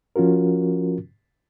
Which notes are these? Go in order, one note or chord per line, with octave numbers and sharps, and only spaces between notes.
F3 C#4 F4 F#4 A#4